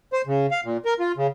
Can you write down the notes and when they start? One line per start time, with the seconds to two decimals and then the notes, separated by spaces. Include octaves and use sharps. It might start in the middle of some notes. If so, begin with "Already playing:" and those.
0.13 C5
0.27 C#3
0.51 F5
0.65 A#2
0.85 A#4
0.99 F4
1.17 C#3